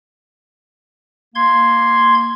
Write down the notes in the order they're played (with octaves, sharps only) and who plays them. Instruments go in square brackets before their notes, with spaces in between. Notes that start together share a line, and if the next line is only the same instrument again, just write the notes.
[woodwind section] A#3 [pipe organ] C6 G#6